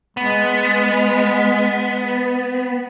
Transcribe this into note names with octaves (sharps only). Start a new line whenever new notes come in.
G#3 B3